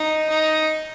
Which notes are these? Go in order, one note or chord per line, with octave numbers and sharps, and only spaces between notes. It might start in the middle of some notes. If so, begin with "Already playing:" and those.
Already playing: D#4
D#4